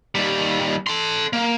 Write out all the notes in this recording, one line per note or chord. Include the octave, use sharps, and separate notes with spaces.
D#2 G3
A4 C6
A#3